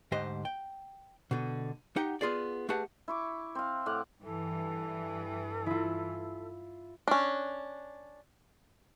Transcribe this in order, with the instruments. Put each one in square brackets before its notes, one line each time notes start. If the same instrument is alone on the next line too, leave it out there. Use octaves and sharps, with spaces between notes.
[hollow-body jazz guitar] D2 G#2 G4 C5 D#5
G5
B2 D3
D#4 G4 F#5 G5
B3 F4 G#4 D5
A3 G4 G#4 B4 F#5 A5
[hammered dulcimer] E4 C#6 D6
C4 F5
A2 F5 F#5 D6
[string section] G2 E3 [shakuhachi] A4
[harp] E4 F4
[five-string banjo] C#4 D4